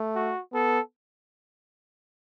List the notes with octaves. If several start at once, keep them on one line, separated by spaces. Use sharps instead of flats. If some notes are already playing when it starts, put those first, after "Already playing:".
Already playing: A3
F#4
B3 A4